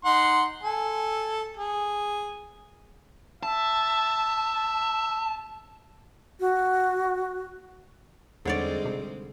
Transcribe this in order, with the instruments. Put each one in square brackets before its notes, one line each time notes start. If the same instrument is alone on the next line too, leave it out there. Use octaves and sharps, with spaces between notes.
[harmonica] D#4 F#5 C6
A4 G#5
G#4
[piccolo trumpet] E5 [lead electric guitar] A5
[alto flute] F#4
[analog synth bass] E2 [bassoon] G#2 [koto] D3 C#5 D5 [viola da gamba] G3 G#3 C4
[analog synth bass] C3